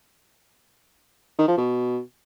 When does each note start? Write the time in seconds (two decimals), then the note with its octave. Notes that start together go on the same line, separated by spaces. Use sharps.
1.38 D#3
1.48 F3
1.57 B2